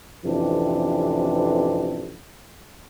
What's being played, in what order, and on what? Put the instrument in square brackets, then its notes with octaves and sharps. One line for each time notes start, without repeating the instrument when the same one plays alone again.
[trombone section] A1 F2 C3 E3 D4